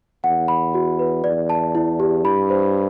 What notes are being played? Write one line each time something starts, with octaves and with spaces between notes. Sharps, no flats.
E2 F#5
B5
F#4
B4
E2 D5
A5
E4
G4
G2 B5
C5